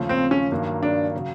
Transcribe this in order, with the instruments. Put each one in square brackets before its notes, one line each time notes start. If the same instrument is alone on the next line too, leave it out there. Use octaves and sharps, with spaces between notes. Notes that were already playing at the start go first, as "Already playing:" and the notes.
Already playing: [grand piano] D#2 C#3 F3 A3
[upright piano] C4
C#4
[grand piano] G2 D#3 F#3 A#3
[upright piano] D4
[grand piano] C#3 F#3